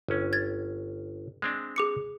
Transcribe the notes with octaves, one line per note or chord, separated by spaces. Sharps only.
G1 C#4
G#6 A6
G#3 C4 D4
G#4 D6 C#7